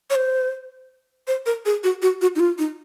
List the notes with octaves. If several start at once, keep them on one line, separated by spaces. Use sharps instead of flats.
C#5
C5
C5
A#4
G#4
F#4
F#4
F#4
D#4
F4
D#4